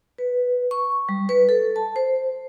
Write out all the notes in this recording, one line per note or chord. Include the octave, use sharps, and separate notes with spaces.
B4
C#6
G3
B4
A4
A5
C5